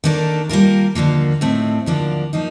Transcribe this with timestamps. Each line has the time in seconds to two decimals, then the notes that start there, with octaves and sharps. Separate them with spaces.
0.04 D#3 A#3 D4 A4
0.49 G3 A#3 F4 A#4
0.95 D#2 D3 F3 A#3
1.41 A2 A3 C4 D#4
1.86 D#2 D3 F3 A#3 D4
2.33 F3 A#3 D#4